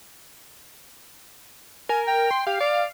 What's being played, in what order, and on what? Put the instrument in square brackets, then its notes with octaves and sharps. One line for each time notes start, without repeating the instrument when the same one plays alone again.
[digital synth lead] A#4 [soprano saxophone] G#5
[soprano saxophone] G5
[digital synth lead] C6
[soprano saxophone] G4 [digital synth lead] F5
[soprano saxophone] D5